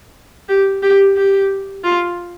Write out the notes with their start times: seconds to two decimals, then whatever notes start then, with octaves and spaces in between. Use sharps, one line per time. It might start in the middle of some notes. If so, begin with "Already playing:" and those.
0.49 G4
0.83 G4
1.17 G4
1.84 F4